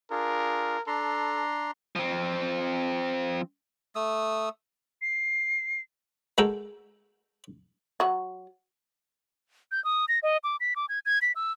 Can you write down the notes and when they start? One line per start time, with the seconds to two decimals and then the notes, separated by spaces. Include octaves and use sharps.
0.11 D4 F4 G#4 A#4
0.87 D4 A4 A#5 C6
1.96 F3 C4
3.95 A3 D#6 E6
5.02 C7
6.38 G#3 F#4 A4 A#4 G5
8.00 F#3 F#4
9.72 G6
9.84 D#6
10.08 A#6
10.23 D#5
10.44 D6
10.60 B6
10.76 D6
10.89 G#6
11.06 G#6
11.22 B6
11.36 E6